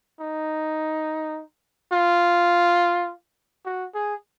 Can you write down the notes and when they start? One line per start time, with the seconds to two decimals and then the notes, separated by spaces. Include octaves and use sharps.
0.20 D#4
1.92 F4
3.65 F#4
3.95 G#4